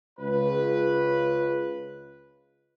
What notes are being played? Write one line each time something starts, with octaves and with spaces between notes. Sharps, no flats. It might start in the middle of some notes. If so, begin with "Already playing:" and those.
C#2 B4